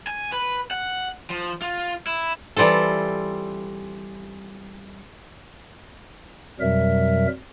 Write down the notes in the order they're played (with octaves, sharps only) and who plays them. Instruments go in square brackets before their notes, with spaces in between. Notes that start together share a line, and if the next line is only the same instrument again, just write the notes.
[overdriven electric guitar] G#5
B4
F#5
F3
F4
E4
[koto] E3 G3 C4 F4 A4
[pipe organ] F2 B2 F#3 G3 A#4 E5